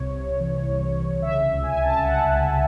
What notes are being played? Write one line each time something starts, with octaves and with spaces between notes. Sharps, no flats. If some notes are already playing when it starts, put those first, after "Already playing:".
Already playing: C2 C3 C#5
C3
E3
C2
C2
C#3 E5
C#2
G#5
C#2
A5
C#2 F#5
C#2